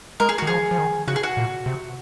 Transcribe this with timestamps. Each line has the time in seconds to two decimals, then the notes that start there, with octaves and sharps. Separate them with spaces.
0.20 G#3 A#4
0.29 G#4
0.38 F#4
0.42 D#3
0.47 F3 G#4
0.71 F3
0.78 D#3
1.08 C#3 F#4
1.16 G#4
1.23 F#4
1.37 A#2
1.66 C3